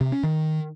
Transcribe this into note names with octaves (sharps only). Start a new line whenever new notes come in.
C3
C#4
D#3